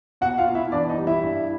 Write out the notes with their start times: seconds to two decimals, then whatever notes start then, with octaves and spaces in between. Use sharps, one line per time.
0.21 B2 F#4 F#5
0.38 F4 F5
0.47 B2
0.55 E4 E5
0.72 E3 D4 D5
0.89 D#4 D#5
0.98 G3
1.07 E4 E5
1.23 G2